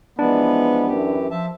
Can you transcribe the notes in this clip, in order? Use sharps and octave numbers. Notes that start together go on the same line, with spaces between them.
E3 F3 G#3 B3 D4
F#2 E3 G4
F3 E5 A5